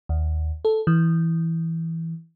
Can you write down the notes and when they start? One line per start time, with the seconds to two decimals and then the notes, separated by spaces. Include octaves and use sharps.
0.09 D#2
0.65 A4
0.87 E3